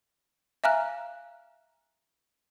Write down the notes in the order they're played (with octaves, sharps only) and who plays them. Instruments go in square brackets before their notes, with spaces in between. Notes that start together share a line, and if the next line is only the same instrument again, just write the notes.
[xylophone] E5 F5 G#5 A#5 F6 F#6